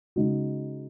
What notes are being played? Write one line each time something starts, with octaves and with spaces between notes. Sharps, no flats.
C#3 G#3 D#4 F#4